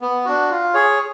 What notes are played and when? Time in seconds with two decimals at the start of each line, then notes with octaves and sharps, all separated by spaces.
0.01 B3
0.25 D4 F#4
0.51 F4
0.74 G#4 C#5